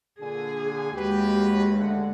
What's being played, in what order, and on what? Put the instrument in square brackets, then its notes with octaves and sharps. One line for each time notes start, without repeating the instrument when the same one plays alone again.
[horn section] A#2 D3 G#5 [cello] G#4
[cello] D#2 G#3 [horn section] F#4 G4 B4
[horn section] D3 A3 F#5